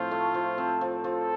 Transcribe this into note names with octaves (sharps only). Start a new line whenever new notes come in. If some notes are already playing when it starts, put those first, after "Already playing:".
Already playing: A2 F3 C4 F4
A3
F3
C4
F3
F3 A4